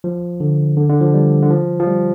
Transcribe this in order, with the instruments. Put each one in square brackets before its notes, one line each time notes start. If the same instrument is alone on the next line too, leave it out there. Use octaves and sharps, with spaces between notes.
[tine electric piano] F3
D3
D3
D3
F3
G3
D3
F3
F3
G3